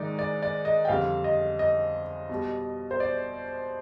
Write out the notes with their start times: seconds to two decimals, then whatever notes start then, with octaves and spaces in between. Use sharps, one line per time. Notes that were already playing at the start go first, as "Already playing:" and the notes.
Already playing: G#2 D#3 G#3 D#4 D5
0.19 D5
0.42 D5
0.65 D#5
0.85 G5
0.88 F2 D3 G3 F5
1.24 D#5
1.59 D#5
2.29 B2 G3
2.91 C5
3.00 D5